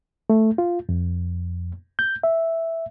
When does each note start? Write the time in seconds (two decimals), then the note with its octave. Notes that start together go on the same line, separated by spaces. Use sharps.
0.30 A3
0.58 F4
0.89 F2
1.99 G6
2.23 E5